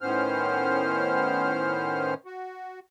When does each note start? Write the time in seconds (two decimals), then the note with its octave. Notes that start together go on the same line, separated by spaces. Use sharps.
0.01 A2 D#3 B3 C#4 C5 F6
2.25 F#4